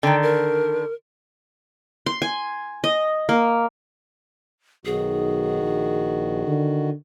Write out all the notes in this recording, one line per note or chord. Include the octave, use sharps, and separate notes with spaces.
D3 D#3 G5
A#4
C6
G#5
D#5
A#3
B1 D#3 F#4 G#4
A#1
D3